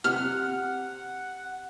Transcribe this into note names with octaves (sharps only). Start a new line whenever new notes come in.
C3 F#5 F6